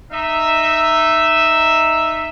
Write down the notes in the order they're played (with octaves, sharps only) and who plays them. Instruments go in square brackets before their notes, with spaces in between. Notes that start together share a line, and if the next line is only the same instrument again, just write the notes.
[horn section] D#4 E5